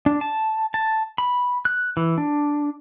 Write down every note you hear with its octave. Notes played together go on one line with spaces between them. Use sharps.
D4
A5
A5
B5
F#6
E3
D4